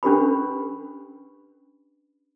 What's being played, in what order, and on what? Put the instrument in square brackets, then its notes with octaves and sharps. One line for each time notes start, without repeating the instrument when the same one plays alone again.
[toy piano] C#4 D4 G4 B4 B5